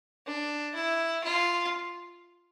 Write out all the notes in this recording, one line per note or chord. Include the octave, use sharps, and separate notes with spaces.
D4
E4
F4